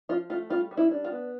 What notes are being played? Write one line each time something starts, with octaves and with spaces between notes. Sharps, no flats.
F3 F4
A3 F4
G3 F4
G3
E4
D4
F4
B3